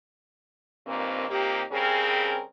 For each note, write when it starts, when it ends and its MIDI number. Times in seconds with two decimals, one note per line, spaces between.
0.87 1.27 43
0.87 1.27 46
0.87 1.27 51
0.87 1.27 58
0.87 1.27 60
1.30 1.63 46
1.30 1.63 58
1.30 1.63 60
1.30 1.63 63
1.30 1.63 67
1.72 2.43 49
1.72 2.43 55
1.72 2.43 60
1.72 2.43 61
1.72 2.43 68
1.72 2.43 70